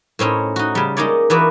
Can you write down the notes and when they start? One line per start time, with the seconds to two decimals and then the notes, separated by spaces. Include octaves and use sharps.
0.19 A2 C4 C#4 D#4
0.56 D#4 F#4
0.75 C#3 G3
0.97 G#3 A#3 D#4 C#5 D5
1.30 E3 A#3 B3 F#4 D5